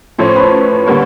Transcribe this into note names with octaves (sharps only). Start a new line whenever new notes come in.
A2 F3 A3 C#4 C5
B4
D3 G3 A#3 C#4